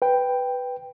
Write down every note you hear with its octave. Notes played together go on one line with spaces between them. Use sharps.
B4 G5